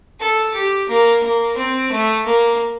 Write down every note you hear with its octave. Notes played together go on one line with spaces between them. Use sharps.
A4
G4
A#3
A#3
C4
A3
A#3